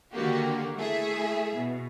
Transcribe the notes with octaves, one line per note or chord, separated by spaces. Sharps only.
D3 D#3 A#3 F#4 G4
A3 E4 G#4 E5
B2